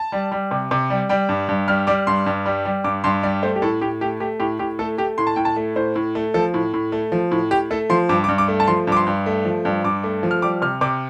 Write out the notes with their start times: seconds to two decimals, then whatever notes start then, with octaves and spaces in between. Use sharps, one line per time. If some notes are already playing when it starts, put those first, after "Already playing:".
Already playing: A5
0.12 G3
0.32 G3
0.51 C3
0.71 C3
0.90 G3
1.09 G3 G5
1.29 G2
1.48 G2
1.68 G3 F6
1.87 G3 D6
2.07 G2 C6
2.26 G2
2.46 G3
2.65 G3
2.84 G2 D6
3.04 G2 C6
3.23 G3 D5
3.42 A3 C5
3.56 G4
3.62 A2 A4
3.81 A2 G4
4.01 A3 G4
4.20 A3 G4
4.40 A2 G4
4.59 A2 G4
4.79 A3 A4
4.98 A3 G4
5.18 A2 C6
5.27 A5
5.36 A2 G5
5.45 A5
5.56 A3
5.76 A2 C5
5.96 A2
6.15 A3
6.34 F3 A4
6.54 A2
6.74 A2
6.92 A3
7.12 F3
7.31 A2
7.51 A2 G4
7.71 A3 A4
7.90 F3 C6
8.09 G2 D6
8.24 D6
8.28 G2
8.38 D6
8.48 A3
8.60 A5
8.68 F3 C6
8.87 G2 D6
8.97 C6
9.07 G2
9.26 A3
9.45 F3
9.65 G2
9.84 G2 D6
10.04 A3
10.23 F3
10.31 F6
10.42 G3 D6
10.62 C3 F6
10.81 C3 D6